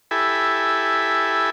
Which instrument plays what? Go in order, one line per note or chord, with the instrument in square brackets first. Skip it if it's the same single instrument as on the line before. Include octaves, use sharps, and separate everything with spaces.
[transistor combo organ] E4 G4 A4 G#5 B5